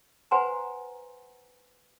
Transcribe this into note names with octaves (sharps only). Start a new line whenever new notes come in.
B4 C5 F#5 G#5 A#5 C6